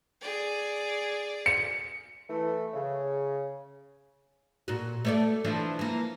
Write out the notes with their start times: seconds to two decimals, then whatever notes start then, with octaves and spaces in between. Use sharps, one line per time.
0.21 G#4 D5
1.46 C#7
2.29 E3 A3
2.73 C#3
4.68 A#2 F#4
5.05 A3 C#5 D5
5.44 E3 F3 D4
5.79 E3 A#3